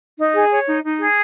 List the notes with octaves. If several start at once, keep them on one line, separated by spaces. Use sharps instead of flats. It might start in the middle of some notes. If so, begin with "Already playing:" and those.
D#4
G#4
C#5
D#4
D#4
G#4